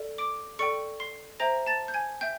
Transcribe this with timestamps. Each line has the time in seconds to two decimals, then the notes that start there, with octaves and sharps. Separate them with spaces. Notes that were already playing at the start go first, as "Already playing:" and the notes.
Already playing: A4 D5
0.18 D6 D7
0.59 A4 D5 G5 C#6 C#7
1.00 C6 C7
1.40 C5 E5 G5 A#5 A#6
1.67 A5 A6
1.88 G6
1.94 G#5 G#6
2.21 E5 G5 G6